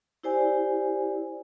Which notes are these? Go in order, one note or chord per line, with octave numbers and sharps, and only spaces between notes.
E4 G4 C5 D5 G#5